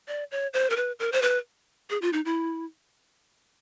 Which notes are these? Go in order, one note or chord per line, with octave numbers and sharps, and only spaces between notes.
D5
C#5
C5
A#4
B4
A#4
C5
B4
G#4
F4
D#4
E4